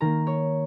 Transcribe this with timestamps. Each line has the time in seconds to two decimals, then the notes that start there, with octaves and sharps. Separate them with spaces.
0.01 D#3 A#3 A#5
0.27 C#5